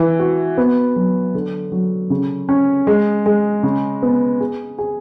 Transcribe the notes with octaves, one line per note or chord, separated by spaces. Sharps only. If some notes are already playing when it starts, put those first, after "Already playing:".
Already playing: E3
F#4
B3
F#3
D3
F#3
C#3
C#4
G#3
G#3
C#3
B3
G#4
G#4